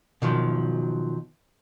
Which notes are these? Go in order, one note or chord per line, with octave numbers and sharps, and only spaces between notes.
B2 D#3 F3 F#3